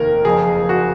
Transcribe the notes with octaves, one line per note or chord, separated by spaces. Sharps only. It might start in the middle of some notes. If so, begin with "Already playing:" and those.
Already playing: F1 D#2 D#3 A#4
F#1 F2 F3 G#4
F#4